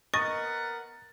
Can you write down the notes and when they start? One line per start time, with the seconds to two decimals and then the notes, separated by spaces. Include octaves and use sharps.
0.14 B3 A#4 D#5 F#5 C#6 A6